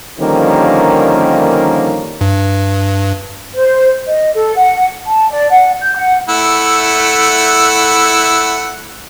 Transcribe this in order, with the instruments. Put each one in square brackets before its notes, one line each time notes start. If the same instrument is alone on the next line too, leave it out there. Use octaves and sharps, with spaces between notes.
[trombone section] D3 D#3 F3 G3 A#3 C#4
[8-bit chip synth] G2
[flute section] C5
D#5
A4
F#5
A5
D5
F#5
G6
F#5
[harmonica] A3 E4 F#5